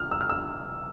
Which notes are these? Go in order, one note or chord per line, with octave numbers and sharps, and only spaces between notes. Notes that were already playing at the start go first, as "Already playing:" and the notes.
Already playing: F6
E6
F6
E6